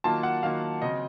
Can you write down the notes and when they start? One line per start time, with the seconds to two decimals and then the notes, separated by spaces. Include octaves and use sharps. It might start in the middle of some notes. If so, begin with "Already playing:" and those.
0.04 D#3 F#3 A#3 F4 A5
0.23 F#5
0.43 D#3 F#3 A#3 F4 F5
0.82 C#3 F#3 C4 D#5